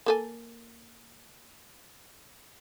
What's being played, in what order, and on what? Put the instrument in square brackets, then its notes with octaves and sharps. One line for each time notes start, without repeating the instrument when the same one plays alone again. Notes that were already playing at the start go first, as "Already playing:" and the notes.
[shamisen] A#3 A4 G#5